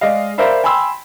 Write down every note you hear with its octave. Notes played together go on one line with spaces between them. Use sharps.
G#3 D5 D#5 F5
A#4 C5 D5 E5 F5 B5
G5 G#5 B5 C6 E6